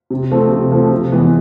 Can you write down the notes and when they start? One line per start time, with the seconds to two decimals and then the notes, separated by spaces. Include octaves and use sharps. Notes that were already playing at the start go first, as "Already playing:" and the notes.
0.10 C3
0.31 F3 A3 C4
0.51 C3
0.72 F3 A3 C4
0.92 C3
1.12 E3 G#3 B3